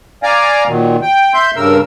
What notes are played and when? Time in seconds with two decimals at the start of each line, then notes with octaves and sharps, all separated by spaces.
0.23 D5 F5 G#5 A#5
0.68 A#2 D#3 F#3
1.02 G5
1.34 E5 C6 G6
1.56 G2 C#3 A#4 E6